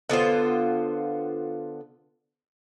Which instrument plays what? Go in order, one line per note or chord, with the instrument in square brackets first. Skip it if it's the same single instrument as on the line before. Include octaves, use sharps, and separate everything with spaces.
[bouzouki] D3 B3 F4 C5